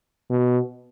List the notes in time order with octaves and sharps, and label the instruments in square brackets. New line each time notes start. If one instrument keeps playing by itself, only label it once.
[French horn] B2